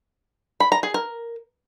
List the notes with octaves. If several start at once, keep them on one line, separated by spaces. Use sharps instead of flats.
B5
A#5
G#4
A#4